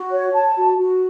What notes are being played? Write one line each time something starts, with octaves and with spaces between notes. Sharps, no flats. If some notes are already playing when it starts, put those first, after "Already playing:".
Already playing: F#4
C#5
A5
F#4
F#4